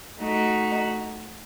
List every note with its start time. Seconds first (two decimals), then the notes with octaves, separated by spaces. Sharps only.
0.19 A3 D#4 F#4